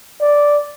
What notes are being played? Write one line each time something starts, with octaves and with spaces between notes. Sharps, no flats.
D5